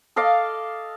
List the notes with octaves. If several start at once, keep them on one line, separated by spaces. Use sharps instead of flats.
A4 D#5 F5 D6